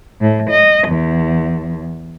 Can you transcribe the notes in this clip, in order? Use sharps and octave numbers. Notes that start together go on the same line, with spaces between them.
A2
D#5
E2